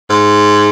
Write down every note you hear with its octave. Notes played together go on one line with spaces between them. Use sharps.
G#2